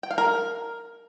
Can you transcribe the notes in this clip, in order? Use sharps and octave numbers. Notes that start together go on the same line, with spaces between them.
G5
F5
A#4